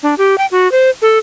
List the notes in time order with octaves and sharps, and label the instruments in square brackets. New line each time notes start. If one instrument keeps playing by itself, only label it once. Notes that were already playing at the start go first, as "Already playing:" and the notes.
[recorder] D4
G4
G5
F#4
C5
A4